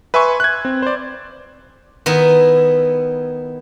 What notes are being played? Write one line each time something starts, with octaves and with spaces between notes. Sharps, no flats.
B4 E5 G#5 C6 C#6
F#6 G#6
C4
C5 D5
D#3 B3 D#4 E4